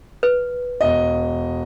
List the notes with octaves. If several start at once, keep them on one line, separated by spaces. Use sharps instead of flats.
B4
E1 D#5